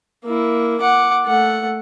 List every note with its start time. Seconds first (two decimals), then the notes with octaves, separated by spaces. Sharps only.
0.25 A#3 E4
0.81 F#5 D6
1.25 A3 F#5